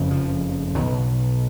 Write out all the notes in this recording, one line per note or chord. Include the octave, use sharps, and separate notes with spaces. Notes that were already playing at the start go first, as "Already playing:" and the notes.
Already playing: F#1 F2 C#3
F3
B1 B2 D#3 F#3